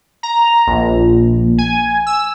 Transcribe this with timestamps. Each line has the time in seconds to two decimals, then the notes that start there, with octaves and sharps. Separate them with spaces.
0.23 A#5
0.67 A#1
1.58 G#5
2.07 E6